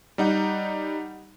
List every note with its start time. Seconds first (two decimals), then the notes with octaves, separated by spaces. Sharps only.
0.18 G3 D#4 F#5